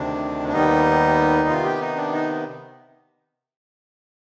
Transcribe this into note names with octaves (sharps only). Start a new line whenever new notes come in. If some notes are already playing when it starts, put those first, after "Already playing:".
Already playing: D2 C3 D#3 D4
D4
D#2 D#3 G3 B3 D#4
C3 D#3 B3 F4
G4
D#4
D4
D#4